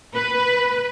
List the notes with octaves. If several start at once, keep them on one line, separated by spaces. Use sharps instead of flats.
B4